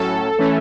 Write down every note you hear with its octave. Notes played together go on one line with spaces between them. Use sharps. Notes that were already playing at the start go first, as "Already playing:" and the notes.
Already playing: A2 F#3 C#4 A4
E3 A3 C#4